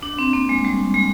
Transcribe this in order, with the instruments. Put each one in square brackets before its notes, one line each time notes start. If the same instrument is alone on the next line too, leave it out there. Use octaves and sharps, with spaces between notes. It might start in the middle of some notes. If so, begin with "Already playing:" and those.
[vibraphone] D4
C4
A#3
G#3
G3
G#3